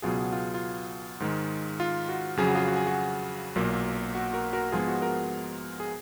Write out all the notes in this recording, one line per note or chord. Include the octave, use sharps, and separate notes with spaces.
C#2 B2 F#3 B3 F4 G#4
F4
F4
G#2 D#3 G#3
F4
F#4
F2 C#3 F#3 G#4
F#4
F4 G#4
F#4
G#4
F#4
B1 A#2 F#3 A#3
F#4
F#4 A#4
F#4 A#4
G#2 F3 G#3 B3 F4 G#4
F#4
F#4 A#4
G#4